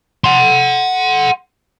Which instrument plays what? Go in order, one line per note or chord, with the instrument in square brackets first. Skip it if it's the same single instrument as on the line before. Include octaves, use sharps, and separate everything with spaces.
[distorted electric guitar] F#5 C6